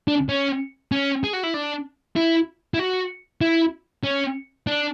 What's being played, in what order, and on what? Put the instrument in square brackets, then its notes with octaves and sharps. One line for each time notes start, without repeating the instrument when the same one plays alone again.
[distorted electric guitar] D4
C#4
C#4
G#4
F#4
E4
D4
E4
E4
F#4
E4
C#4
D4